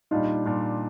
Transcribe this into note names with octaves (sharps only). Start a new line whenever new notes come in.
A#2 G3 D4 D#4 F4
A#2 G3 D4 F4